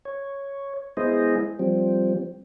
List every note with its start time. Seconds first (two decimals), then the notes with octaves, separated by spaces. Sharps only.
0.05 C#5
0.97 G#3 B3 E4 G#4 C5 D#5
1.59 F3 G3 C4